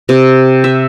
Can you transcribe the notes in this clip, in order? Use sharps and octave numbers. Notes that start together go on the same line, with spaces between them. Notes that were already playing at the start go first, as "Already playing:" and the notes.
C3
E5